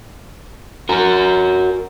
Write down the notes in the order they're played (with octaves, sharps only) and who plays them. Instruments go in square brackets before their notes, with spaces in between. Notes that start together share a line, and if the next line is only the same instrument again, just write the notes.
[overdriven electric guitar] F#4 A#4